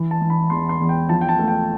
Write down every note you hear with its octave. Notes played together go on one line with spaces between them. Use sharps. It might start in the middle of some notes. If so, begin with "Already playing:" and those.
Already playing: E3
A5
E3
B5
E2 C6
C6
E2
G5
F3 A5
G5
A5
A3
G5